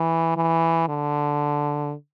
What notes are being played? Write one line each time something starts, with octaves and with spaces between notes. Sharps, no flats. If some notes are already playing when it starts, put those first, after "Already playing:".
Already playing: E3
E3
D3